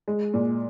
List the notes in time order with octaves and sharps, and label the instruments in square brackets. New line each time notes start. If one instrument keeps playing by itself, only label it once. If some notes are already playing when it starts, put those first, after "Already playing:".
[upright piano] G#3
A#2